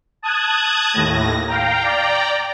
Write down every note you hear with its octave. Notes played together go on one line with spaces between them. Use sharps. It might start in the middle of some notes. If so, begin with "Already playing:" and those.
A5 D#6 F#6 G#6
D#2 A2 A#6
F5 G5 A#5
D5 G5 A#5